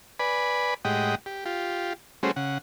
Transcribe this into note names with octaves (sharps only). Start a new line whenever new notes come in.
B4 D5 G#5 B5
A2 G#3 G4 D#5 F#5 G5
G4
F4 G4
G3 A3 C#4 F#4 G#4 C5
C#3 F#5